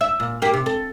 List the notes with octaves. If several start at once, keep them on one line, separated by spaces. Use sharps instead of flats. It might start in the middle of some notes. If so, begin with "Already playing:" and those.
E5
A#2
A#3 G4
C3
A4